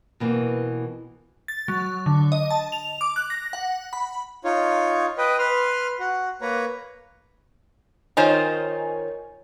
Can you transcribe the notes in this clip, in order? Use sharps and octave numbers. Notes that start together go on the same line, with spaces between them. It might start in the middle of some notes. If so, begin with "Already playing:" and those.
B2 E3 A#3 C4
A6
F#3
D3
D#5
A5
F7
D6
F#6
A#6
F#5
B5
D#4 F4 C#5
B4 D#5 G5
B4 C6 F6
F#4
A#3 B4 C#5 A#5
D#3 D#4 F4 A#4 C5 C#5 G#5